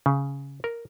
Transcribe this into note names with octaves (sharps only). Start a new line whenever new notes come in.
C#3
A#4